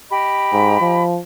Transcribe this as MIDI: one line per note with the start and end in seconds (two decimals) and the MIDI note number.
0.10 1.03 67
0.10 1.03 75
0.10 1.03 83
0.53 0.78 44
0.81 1.20 53